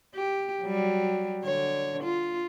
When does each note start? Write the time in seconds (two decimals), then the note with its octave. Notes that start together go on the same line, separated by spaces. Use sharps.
0.15 G4
0.63 F#3 G3
1.43 D3 C#5
2.04 F4